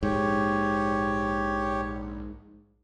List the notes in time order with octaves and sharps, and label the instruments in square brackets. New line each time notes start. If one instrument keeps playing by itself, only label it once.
[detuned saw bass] A#1 [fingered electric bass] G#2 [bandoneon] G4 C#5